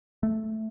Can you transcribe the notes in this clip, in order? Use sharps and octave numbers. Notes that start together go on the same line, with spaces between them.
A3